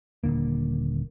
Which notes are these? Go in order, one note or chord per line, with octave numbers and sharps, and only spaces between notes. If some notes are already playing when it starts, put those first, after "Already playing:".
D#1 D#2 D3 A#3